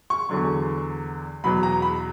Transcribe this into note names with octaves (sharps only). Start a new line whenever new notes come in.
C#6
E2 D3 F#3
E2 B2 F#3 B5
A#5
B5